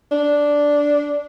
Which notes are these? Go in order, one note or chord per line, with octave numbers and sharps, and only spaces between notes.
D4